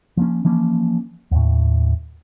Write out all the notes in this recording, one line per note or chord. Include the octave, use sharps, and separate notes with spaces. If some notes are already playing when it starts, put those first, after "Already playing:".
F3 A#3 C#4
E3 F3 A#3 C#4
D#2 A2